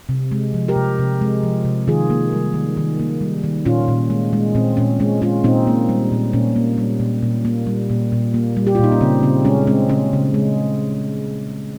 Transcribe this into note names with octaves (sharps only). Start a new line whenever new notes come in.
C3
G#3
F3
G4 A#4
C3
C3
G#3
F3
C3
D#3 F4 G#4
A#3
G3
D#3
D#3
A#3
G3
D#3
A#2 C#4 F4
A#2
G#3
G#3
A#2 C4
A#2 C#4
G#3 C#4
G#3 C#4 F4
A#2 C4 D#4
A#3
G3
A#2
A#2 C#4
A#3
G3
A#2
A#2
A#3
G3
A#2
A#2
A#3
G3
G4
F4
A#2 D#4
C#4
C#3 C4
C#3 C4
G#3 C#4
G#3 C4
C#3 C#4
C#3
G#3